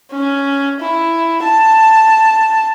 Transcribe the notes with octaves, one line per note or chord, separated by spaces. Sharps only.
C#4
E4
A5